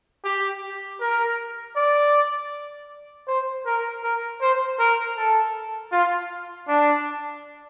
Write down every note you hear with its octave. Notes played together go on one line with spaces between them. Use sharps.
G4
A#4
D5
C5
A#4
A#4
C5
A#4
A4
F4
D4